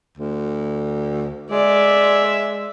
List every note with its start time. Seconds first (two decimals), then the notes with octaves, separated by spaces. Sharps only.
0.18 D2
1.51 G#3 D5 E5